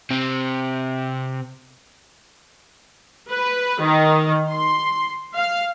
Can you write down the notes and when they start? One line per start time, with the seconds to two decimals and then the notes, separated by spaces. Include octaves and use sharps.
0.10 C3 C4
3.30 B4
3.83 D#3
4.52 C6
5.36 F5